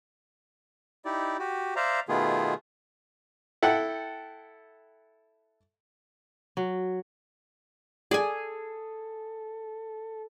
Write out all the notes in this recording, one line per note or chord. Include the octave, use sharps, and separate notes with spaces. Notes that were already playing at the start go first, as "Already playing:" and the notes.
D#4 E4 G4 D5
F#4 G4
C5 D5 E5 F5 A#5
B2 D#3 A3 B3 F4 G#4
E4 A4 F#5 G5
F#3
G#4 A4 D5 G#5